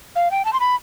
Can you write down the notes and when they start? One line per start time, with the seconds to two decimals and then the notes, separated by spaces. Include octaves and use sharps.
0.15 F5
0.31 G5
0.45 A5
0.53 C6
0.60 B5